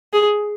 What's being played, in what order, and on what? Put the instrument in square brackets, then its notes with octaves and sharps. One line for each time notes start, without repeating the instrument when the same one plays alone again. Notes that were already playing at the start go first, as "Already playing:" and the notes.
[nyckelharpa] G#4